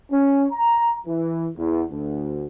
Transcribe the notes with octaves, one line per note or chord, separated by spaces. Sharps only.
C#4
A#5
E3
E2
D2